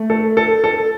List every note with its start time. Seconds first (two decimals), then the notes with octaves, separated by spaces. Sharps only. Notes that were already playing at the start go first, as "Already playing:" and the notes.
Already playing: A3
0.10 A4
0.37 A4
0.64 A4